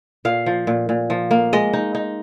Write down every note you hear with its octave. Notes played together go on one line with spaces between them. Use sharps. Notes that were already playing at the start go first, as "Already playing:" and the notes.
A#2 F5
F3
A#2
A#2
F3
A#3
G#3 D#5
D#4
D#4